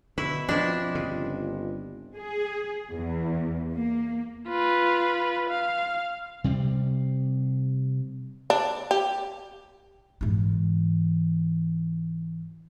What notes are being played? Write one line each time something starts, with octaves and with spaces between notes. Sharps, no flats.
B2 D3 E4 C#6
F3 C4 D4 E4 F4 D#5
G1 C#3
G#4
E2
A#3
F4 B4
F5
C3 G3 C4
D4
G4
G#2 E3